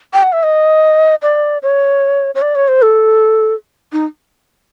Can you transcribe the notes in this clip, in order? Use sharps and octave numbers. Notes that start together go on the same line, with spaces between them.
G5
F#5
E5
D#5
D5
C#5
C#5
D5
C#5
C5
A4
D#4